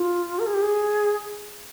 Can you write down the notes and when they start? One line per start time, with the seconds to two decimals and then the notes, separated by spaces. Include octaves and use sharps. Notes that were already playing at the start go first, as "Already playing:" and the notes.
Already playing: F4
0.39 A#4
0.47 G#4
0.54 G4
0.62 G#4